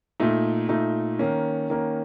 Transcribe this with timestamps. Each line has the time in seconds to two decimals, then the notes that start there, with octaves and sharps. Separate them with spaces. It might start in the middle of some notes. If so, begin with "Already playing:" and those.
0.20 A#2 A3 D#4
0.69 A#2 A3 D#4
1.19 D#3 A#3 C#4
1.70 D#3 A#3 C#4